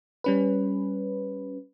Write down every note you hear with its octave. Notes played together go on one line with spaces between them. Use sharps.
G3 C#4 B4